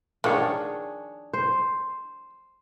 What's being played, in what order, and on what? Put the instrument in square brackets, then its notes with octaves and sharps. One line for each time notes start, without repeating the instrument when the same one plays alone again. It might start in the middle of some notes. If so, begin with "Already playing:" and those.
[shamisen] D#3 F3 F#5 [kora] D4 G#4 C#5
[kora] C5